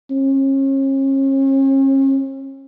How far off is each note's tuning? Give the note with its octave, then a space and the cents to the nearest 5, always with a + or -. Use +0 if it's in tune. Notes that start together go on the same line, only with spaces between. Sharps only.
C#4 -40